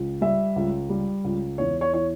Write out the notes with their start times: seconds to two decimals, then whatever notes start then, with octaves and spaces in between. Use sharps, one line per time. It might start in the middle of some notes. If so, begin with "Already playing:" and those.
Already playing: C#2
0.21 G3 E5
0.56 C#2
0.90 G3
1.24 C#2
1.58 E2 C#5
1.81 C#5
1.93 E3 C#5